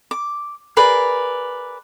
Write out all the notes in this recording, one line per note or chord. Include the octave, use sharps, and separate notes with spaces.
D6
G#4 A#4 B4 D5